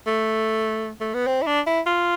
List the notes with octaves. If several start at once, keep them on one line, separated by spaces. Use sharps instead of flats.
A3
A3
B3
C4
E4
D4
E4
F4